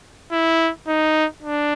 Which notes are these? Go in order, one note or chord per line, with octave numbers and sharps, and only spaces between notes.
E4
D#4
D4